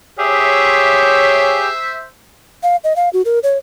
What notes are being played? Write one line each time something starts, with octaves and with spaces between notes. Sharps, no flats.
G4 G#4 C5 C#5 E5
F5
D#5
F5
F#4
A#4
C#5